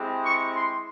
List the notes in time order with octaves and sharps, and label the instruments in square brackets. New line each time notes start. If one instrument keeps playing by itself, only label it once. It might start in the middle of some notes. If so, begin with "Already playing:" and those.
Already playing: [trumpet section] G#3 C4 E4 G4
C#6
C6